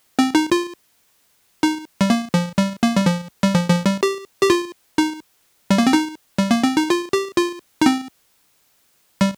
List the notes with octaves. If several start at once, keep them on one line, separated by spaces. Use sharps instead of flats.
C4
D#4
F4
D#4
G3
A#3
F3
G3
A#3
G3
F3
G3
F3
F3
G3
G4
G4
F4
D#4
G3
A#3
C4
D#4
G3
A#3
C4
D#4
F4
G4
F4
D#4
C4
G3